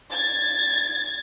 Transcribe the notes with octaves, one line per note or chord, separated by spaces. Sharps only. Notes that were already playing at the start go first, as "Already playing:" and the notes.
G#6 A6